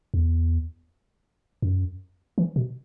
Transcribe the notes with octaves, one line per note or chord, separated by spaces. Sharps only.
E2
F#2
E3
B2